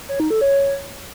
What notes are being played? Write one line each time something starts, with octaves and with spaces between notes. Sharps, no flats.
C#5
D#4
A4
C#5